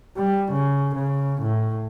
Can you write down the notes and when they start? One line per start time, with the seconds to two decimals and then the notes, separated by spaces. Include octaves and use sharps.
0.17 G3
0.52 C#3
0.94 C#3
1.41 A2